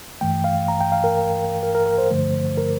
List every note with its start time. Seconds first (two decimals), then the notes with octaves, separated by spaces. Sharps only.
0.21 G2 E3 A3 G5
0.44 F5
0.68 A#5
0.81 G5
0.92 F5
1.04 A#4
1.63 A#4
1.75 A#4
1.86 A#4
1.98 C5
2.11 G2 D3 F3 A3
2.57 A#4